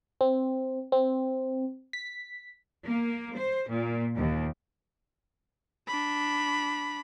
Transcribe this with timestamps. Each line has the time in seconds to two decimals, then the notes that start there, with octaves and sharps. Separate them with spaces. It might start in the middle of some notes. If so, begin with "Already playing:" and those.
0.21 C4
0.92 C4
1.93 B6
2.84 A#3
3.36 C5
3.70 A#2
4.15 D#2
5.87 D4 B5